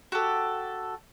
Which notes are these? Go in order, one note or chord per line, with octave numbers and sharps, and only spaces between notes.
F#4 G4 A4